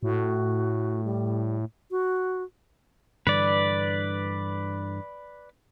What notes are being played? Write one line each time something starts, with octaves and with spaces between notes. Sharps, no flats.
A2 F#4
G3
F#4
G2 D3 E3 B4 D5